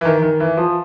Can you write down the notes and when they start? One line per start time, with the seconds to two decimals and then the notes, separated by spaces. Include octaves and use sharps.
0.01 E3
0.05 D#3
0.23 D#3
0.40 E3
0.57 F3